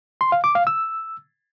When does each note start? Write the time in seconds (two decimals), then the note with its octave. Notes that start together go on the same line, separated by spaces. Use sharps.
0.21 C6
0.32 F5
0.44 D6
0.55 F5
0.67 E6